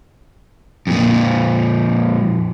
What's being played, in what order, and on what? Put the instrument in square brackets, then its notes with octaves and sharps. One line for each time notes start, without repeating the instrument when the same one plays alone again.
[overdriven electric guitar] F2 A#2